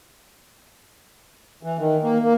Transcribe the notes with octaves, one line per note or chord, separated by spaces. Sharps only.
E3
D#3
A#3
A#3